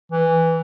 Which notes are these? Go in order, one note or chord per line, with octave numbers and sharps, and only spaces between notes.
E3